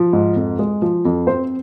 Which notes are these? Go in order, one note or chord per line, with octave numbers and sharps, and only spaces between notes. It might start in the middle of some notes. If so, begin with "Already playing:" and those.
Already playing: F3
G#2
F2
G#3
F3
F2
C4 C5